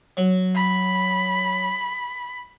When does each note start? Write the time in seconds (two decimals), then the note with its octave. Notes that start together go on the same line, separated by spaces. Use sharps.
0.17 F#3
0.55 B5